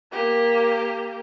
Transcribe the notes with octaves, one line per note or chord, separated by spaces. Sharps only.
A#3 G4